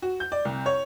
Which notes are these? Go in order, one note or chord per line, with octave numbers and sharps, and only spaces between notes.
F#4
G6
D5
C2
C#5